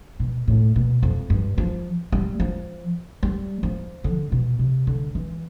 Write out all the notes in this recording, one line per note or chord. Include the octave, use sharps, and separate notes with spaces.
B2
A2
B2
F2
G2
F3
G3
F3
G3
F3
D3
B2
C3
D3
E3